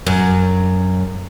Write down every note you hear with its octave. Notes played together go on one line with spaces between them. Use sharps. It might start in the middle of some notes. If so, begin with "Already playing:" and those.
F#2